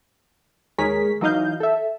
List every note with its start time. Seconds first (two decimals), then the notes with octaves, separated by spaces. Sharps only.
0.78 D#2 G#3 G#4 A#4 C#5 B6
1.21 E3 F#3 D#4 D#5 F5 G6
1.60 A4 E5